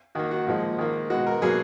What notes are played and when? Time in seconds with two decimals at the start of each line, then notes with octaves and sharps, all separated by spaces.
0.15 D#3 A#3 F#4
0.31 F#4
0.47 A#2 F3 G#3
0.78 D#3 A#3
1.10 B2 G#3 F#4
1.26 A#4
1.42 B2 F#3 A#3 G#4